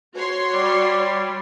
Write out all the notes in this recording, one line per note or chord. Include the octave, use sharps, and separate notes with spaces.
F#4 C#5 C6
G3 D5